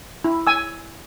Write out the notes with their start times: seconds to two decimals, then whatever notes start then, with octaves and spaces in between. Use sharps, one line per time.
0.25 E4
0.47 G#5 E6